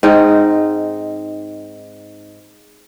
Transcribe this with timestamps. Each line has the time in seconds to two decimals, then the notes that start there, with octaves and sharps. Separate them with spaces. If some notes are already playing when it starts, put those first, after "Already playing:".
0.03 G#2 C4 D#4